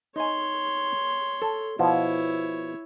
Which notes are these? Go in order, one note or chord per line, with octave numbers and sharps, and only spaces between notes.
D#4 C#5 G#5 C6
A4
B2 F3 E4 C#5